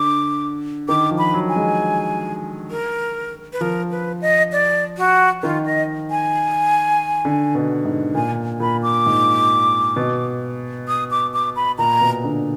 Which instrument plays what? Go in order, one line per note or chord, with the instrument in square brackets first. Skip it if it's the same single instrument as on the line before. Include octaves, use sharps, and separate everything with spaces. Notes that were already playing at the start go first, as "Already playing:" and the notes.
Already playing: [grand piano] D3 [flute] D6
[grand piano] D#3 [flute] D6
[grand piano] F3
[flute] B5
[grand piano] F#3
[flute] G#5
[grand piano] G#3
[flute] A#4
B4
[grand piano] F3 [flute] A#4
[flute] B4
D#5
D5
F#4
[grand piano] D#3 [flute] F4
[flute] D#5
G#5
[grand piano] D3
B2
G#2
[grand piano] A#2 [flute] G#5
[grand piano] A#2 [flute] B5
[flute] D6
[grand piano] G#2
B2
[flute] D#6
D6
D6
B5
[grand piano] A#2 [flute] A#5
[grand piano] B2
D3